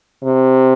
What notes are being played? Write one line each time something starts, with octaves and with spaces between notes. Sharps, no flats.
C3